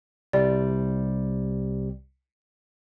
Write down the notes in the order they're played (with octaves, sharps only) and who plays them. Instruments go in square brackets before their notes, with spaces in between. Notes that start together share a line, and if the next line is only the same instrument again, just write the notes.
[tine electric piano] C2 C3 G3 [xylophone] D5